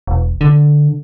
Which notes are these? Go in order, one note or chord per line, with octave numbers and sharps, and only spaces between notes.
E1
D3